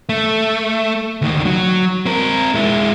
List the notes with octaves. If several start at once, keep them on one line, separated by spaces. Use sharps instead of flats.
A3
D2 D#3
F#3
C4 A#4
G#3 E4